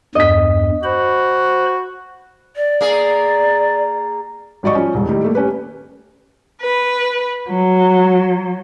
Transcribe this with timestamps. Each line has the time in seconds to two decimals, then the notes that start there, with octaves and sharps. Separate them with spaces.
0.15 E2 G2 D#5 B6
0.83 F#4 C5 B5
2.56 D5
2.81 A#3 G#4
4.63 G#1 F#3 D5 D#5 C#6
4.75 F3 C#4
4.94 E1 C2
5.09 A2 D#3 G3
5.22 G3 A3 A#3
5.35 C#4 G4 B4
6.62 B4
7.49 F#3